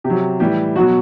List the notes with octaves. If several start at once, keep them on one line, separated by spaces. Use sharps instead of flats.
C3 G4
F#3
A2 E3 G3 G4
B2 F#3 F#4